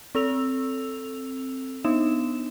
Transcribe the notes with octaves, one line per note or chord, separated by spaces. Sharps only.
C4 A4 E6 F7
B3 D4 D#4 E7